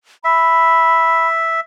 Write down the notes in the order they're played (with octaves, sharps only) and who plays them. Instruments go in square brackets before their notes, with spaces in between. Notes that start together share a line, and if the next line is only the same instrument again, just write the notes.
[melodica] E5 [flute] B5